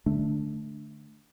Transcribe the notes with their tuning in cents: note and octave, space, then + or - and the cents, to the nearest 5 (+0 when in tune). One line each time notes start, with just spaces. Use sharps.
D3 +15 A3 -5 D4 +0